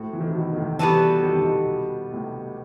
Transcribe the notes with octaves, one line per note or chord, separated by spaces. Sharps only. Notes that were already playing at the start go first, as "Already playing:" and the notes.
Already playing: A2 F#4 C5
E3
D#3
C3
B2
D#3
A2 C3
C3 E3 G3 B3 F#4 A4
D#3
C3
B2 D#3
A2 C3